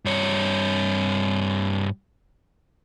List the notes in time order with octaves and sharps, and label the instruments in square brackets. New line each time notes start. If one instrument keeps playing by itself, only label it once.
[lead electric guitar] G2 C#5